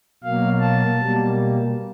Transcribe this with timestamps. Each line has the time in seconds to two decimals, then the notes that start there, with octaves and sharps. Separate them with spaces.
0.23 B2 F#3 A#3 F5
0.60 A5
0.98 B2 G3 A#3